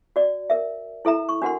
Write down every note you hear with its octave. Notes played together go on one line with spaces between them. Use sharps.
F#4 D5
A#4 E5
E4 A4 E5 A#5
C#6
D4 F#4 A#4 F#5 C6